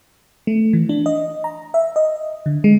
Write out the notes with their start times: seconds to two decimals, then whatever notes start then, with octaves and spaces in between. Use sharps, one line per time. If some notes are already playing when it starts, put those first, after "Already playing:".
0.47 A3
0.73 E3
0.89 D4
1.06 D#5
1.44 A#5
1.74 E5
1.96 D#5
2.46 D3
2.64 G#3